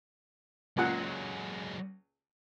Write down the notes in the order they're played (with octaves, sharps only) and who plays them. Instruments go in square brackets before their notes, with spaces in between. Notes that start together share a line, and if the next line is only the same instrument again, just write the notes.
[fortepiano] C#2 A#2 F#5 [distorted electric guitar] F#3 G#3